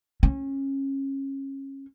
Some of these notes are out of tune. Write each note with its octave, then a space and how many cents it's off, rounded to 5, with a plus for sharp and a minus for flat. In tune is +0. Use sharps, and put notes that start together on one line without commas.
C#4 -25